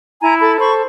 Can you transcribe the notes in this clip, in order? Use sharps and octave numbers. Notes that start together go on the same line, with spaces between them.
E4 G#5 A#5
A4 A5 B5
C5 B5 C#6